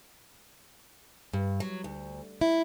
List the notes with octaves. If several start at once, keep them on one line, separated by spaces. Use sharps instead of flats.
G2
F#3
D2
E4